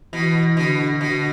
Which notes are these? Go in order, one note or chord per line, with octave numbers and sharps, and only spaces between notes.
B2 E3
B2 D3
B2 D3